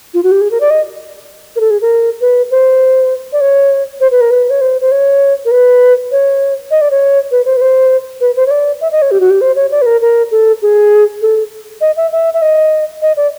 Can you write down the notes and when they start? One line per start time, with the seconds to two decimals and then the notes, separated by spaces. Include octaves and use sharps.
0.14 F4
0.23 F#4
0.31 G4
0.41 G#4
0.51 A#4
0.60 D5
0.70 D#5
1.56 A#4
1.60 A4
1.70 G#4
1.81 A#4
2.21 B4
2.51 C5
3.33 D5
3.41 C#5
4.00 C5
4.11 B4
4.21 A#4
4.31 B4
4.50 C#5
4.61 C5
4.81 C5
4.91 C#5
5.45 A#4
5.51 B4
6.12 C#5
6.71 D#5
6.81 D5
6.91 C#5
7.31 B4
7.45 C5
7.57 B4
7.61 C5
8.21 B4
8.36 C5
8.46 C#5
8.51 D5
8.81 E5
8.92 D#5
9.02 C#5
9.11 G4
9.20 F#4
9.30 G4
9.41 C5
9.56 C#5
9.71 D5
9.82 B4
9.86 A#4
10.01 A#4
10.31 A4
10.62 G#4
11.21 A4
11.81 D#5
11.97 E5
12.12 E5
12.34 E5
12.42 D#5
13.02 D#5
13.17 D5